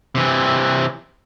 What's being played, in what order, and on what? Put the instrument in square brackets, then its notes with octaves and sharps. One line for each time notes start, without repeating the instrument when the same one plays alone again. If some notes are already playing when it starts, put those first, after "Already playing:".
[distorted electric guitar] C3 E3